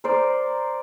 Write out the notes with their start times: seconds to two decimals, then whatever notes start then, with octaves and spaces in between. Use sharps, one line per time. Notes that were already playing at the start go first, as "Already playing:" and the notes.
0.04 A#4 C5 D5